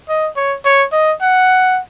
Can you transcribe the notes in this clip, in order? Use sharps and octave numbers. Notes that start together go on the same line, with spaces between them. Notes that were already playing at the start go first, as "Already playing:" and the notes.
D#5
C#5
C#5
D#5
F#5